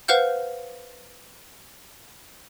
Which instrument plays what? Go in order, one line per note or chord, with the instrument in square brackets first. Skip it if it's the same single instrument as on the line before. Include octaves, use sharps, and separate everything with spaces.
[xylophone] B4 C5 F5 F#5 F6 G6